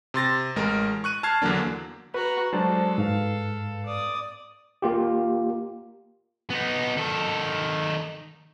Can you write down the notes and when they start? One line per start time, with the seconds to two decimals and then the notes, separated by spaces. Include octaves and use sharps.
0.14 C3 C6 A6 A#6
0.56 A1 G#3 A#4
1.04 C#6 F#6 D#7
1.23 A5 F6 G#6 C7
1.42 E2 D3 F#3 A#3 D4
2.14 F#4 B4 A#5
2.53 F#3 G#3 D4 A4 C5 A5
2.98 G#2 B4 F5
3.86 D5 D#6
4.82 A#3 F4 G4
6.50 B3 D#4
6.97 D#3 A4